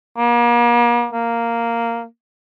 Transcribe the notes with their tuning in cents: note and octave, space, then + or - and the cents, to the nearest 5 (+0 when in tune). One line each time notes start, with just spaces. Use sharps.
A#3 +40
A#3 -5